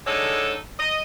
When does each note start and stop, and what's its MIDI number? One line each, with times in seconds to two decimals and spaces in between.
0.07 0.57 50
0.07 0.57 56
0.07 0.57 63
0.07 0.57 69
0.07 0.57 73
0.79 1.02 75